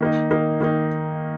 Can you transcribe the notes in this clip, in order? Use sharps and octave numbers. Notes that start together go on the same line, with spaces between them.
D#3 A#3 D#4
D#3 A#3 D#4
D#3 A#3 D#4